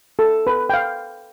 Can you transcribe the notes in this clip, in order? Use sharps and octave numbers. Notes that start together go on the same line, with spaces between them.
A4
B4
G5
F5